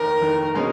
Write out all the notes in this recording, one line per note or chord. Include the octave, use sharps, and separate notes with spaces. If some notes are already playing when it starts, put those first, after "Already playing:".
Already playing: F1 D#2 D#3 A#4
F1 D#2 D#3
B2 G#3 C#4